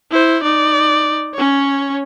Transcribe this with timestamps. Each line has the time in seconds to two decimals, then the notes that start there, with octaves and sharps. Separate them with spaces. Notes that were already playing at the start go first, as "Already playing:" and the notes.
0.11 E4 C5
0.43 D#4 D5
1.35 C#4 C#5